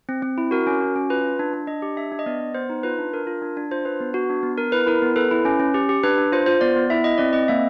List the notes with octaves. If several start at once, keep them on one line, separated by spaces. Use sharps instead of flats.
C4
C4
E4
F#4 A#4
C#4
F#4
C#4
F4 B4
F4
D4
D4
D4 D#5
G4
D4 E5
D4
D#5
B3 D5
B3
B3 C5
D#4
F4 B4
D4
D4 A#4
F4
D4
D4
F4 C5
D4 B4
B3
F#4
D4
B3
B3 A#4
E4 B4
E4 A#4
B3
A4 B4
E4
C#4
C#4
G4
G4
D4 B4
D4
F4 C5
F4 C5
B3 D5
B3
E4 E5
E4 D#5
C4 D5
C4 D#5
A#3 E5